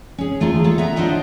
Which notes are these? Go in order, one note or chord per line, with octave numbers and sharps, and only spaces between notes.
C#4 G#4
E2 A3 F4 G#4 A#5
F4 A4 C#5
B3 E5 A#5
D4 F4 C5 C#5 D#5 F#5